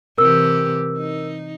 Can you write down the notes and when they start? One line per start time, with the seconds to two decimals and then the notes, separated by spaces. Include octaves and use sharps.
0.18 C3 E3 G4 A#4 E6
0.97 D#4